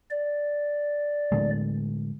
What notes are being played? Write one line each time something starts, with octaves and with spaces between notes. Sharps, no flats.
D5
A2 D3 G#3